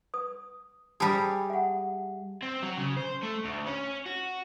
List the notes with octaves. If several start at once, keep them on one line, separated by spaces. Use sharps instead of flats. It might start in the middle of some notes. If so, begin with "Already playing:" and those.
B4 D#6
G3 G#4 G#5 A5 B5
E5 F#5
C4
F#3
C#3
C5
A3
D2
C#4
F#4